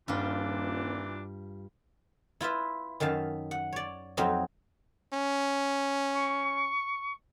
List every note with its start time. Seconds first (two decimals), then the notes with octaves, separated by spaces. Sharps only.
0.08 D#1 G2 A#2 E3 D4 F4
2.41 E4 F4 B4 E5
3.00 F#2 D#3 E5 F5 A5
3.51 F#5
3.72 C#5 D5
4.17 F2 F#3 C4 D#4
5.13 C#4
6.14 C#6